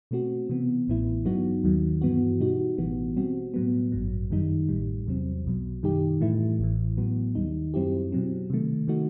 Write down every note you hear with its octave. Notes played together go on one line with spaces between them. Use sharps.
B2 A3 C4 F#4
C3 E3 B3
A1 A2 E3 B3 E4
G2 F#3 B3 D#4 F#4
D#2 D#3 F#3
G2 E3 B3 F#4
B2 G3 D#4 F#4
A1 A2 E3 B3 F#4
B2 G3 C4 F#4
A2 F#3 B3
A1 G2 F#3
F#2 D#3 G3 D#4
A1 A2 G3
E2 C3 F#3 C4
B1 B2 F#3
F#2 D#3 G3 D#4 G4
A2 E3 A3 E4
A1 A2 E3
A2 F#3 B3
D#2 D#3 G3 D#4
F#2 F#3 C4 E4 G4
B2 F#3 C4
C3 D#3 A3
C3 D#3 A3 D#4 F#4